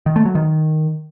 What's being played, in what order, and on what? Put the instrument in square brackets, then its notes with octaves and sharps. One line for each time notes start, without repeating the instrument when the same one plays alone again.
[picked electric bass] D#3
A3
F#3
D#3